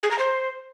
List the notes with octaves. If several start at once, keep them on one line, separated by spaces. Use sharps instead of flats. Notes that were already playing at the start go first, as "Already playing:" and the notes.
G#4
A#5
C5